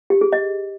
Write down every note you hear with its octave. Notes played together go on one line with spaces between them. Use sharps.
G4
G#4
D#5